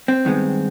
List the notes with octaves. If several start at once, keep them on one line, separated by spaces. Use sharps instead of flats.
C4
G2 D#3 G#3 B3